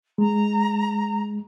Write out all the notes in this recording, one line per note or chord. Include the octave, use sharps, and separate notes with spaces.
G#3 A#5